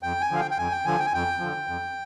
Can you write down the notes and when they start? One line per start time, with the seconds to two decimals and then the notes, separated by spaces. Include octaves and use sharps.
0.03 F2 G5
0.21 G#5
0.31 D3 F3 F5
0.40 G5
0.51 G5
0.58 F2 G#5
0.72 G5
0.85 D3 F3 G#5
0.99 G5
1.06 G#5
1.13 F2 G5
1.40 D3 F3
1.67 F2